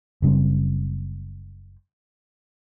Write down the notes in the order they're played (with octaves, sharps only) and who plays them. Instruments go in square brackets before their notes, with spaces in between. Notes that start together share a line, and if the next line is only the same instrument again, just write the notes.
[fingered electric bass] F#1 C#3 G3 C4